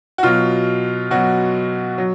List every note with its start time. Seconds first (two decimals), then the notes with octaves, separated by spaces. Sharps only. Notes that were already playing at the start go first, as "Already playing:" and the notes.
0.18 F#4
0.23 B2 F#3 F4
1.11 B2 F#3 F#4
1.98 F#3